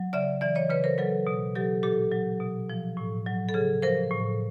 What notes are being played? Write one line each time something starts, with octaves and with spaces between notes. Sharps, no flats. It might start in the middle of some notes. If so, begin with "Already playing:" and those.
Already playing: F#3
C#3 D5 E5
E3 D5 E5
C#5 D#5
C#3 B4 C#5
A#4 C5
F#3 A4 B4
B2
F#3 G4 A4
A#2 G4 A4
F#3
B2
F3
A2
F#3
A4
C#3 G#4
F3 A#4 C5
A2